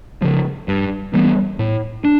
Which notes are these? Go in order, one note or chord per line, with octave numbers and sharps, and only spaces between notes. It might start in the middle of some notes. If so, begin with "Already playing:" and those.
C#3 F3
G2
E3 G3 B3
A2
D4